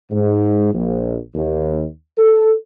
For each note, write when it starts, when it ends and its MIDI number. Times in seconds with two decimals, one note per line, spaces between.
0.11 0.73 44
0.73 1.17 34
1.35 1.85 39
2.18 2.52 69